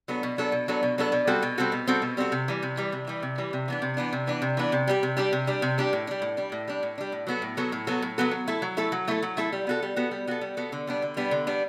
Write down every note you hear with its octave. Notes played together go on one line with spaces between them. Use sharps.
F#3 B3 D4 A4
B2
F#3 B3 D4 A4
B2
F#3 B3 D4 A4
B2
F#3 B3 D4 A4
B2
G3 C4 F#4 A4
B2
G3 C4 F#4 A4
B2
G3 C4 F#4 A4
B2
G3 C4 F#4 A4
C3
E3 G3
C3
E3 G3
C3
E3 G3
C3
E3 G3
C3
E3 B3 D4
C3
E3 B3 D4
C3
E3 B3 D4
C3
E3 B3 D4
C3
G3 D4 G4
C3
G3 D4 G4
C3
G3 D4 G4
C3
G3 D4 G4
A2
G3 D4
A2
G3 D4
A2
G3 D4
A2
G3 D4
A2
F#3 B3 F#4 A4
A2
F#3 B3 F#4 A4
A2
F#3 B3 F#4 A4
A2
F#3 B3 F#4 A4
F#3
A3 E4 A4
F#3
A3 E4 A4
F#3
A3 E4 A4
F#3
A3 E4 A4
G3
B3 F#4 A4
G3
B3 F#4 A4
G3
B3 F#4 A4
G3
B3 F#4 A4
D3
G3 B3 D4
D3
G3 B3 D4
D3
G3 B3 D4